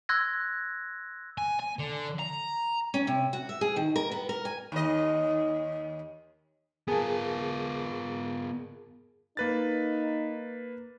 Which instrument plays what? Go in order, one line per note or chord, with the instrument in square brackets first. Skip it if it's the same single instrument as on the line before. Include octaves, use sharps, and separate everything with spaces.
[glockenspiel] C6 E6 F#6 G#6 A#6
[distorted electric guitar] G#5
G#5
D3
A#5
[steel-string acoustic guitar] C#4
C3
F#4
E5
G#4
D#3
A#4
B3
A#4
G#5
[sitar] D#2 D#5
[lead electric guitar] B3 F4 [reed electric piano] G#4 A#4 A5
[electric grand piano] A#3 B4 A6 [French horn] D#4